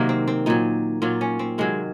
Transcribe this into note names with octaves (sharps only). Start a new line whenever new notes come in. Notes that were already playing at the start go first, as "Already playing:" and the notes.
Already playing: C3 D#3 F#3 A#3
C4
C4
A#2 F#3 D#4
A#2 F#3 F4
C#4
C4
C3 D#3 F#3 G#3